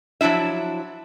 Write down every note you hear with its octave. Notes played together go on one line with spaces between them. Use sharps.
F3 F#3 D4 E4 E5